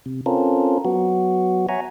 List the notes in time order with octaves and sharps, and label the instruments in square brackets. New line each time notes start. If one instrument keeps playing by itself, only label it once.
[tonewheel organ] C3
C4 C#4 F4 A4 A#4
F#3 B3 F#4
C#5 E5 F#5 G#5 A#5